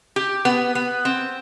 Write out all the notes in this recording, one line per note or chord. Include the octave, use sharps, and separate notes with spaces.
G4
B3
B3
C4